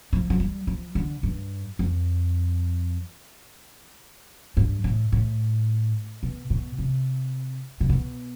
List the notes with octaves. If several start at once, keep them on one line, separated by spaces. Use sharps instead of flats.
F3
F3
G3
F3
D3
G2
F2
G2
A2
A2
B2
B2
C3
C3
B2